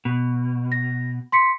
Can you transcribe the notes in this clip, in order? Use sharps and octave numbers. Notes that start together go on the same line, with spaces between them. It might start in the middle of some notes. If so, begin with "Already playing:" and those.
B2
A#6
C6 B6 C#7